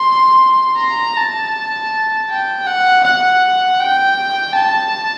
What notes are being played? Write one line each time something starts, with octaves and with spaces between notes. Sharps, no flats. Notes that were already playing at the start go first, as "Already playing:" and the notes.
Already playing: C6
A#5
A5
G5
F#5
F#5
G5
A5